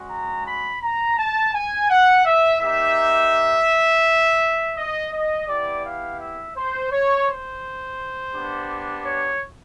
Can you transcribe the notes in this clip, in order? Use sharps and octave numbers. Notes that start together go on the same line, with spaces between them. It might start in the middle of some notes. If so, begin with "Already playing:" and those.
Already playing: G#3 C#4 F#4
A#5
B5
A#5
A5
G#5
F#5
E5
A#3 D#4 G4 E5
D#5
D#5
B3 E4 G4 D5
F5
E5
C5
C#5
C5
B3 D4 G4
C#5